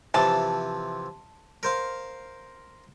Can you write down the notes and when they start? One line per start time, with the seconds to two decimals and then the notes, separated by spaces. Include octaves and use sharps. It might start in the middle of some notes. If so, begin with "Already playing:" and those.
0.14 C3 E3 F3 A5
1.63 A#4 C5 F5